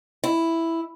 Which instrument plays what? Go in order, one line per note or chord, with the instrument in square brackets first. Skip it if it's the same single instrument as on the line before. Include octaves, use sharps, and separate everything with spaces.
[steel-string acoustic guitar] E4